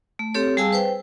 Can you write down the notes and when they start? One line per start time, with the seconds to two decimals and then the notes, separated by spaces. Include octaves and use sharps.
0.19 A3
0.34 C4 G4 A4 C#5
0.57 G3 G#4 F5 G#5 A5 E6
0.73 B4 C5 G5